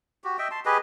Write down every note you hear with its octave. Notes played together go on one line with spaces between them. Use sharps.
F#4 G4
D#5 E5 G5
A5 C6
G4 G#4 B4 D#5